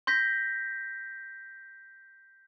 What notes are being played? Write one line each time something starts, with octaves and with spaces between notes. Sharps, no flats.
C6 G6 A#6 B6